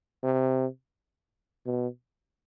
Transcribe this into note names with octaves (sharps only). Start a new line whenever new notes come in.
C3
B2